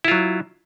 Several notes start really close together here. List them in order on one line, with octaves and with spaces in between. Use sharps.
E4 F4 F#3